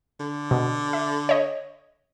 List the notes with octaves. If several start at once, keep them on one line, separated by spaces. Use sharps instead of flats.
D3
B2
E5
C#5 D#5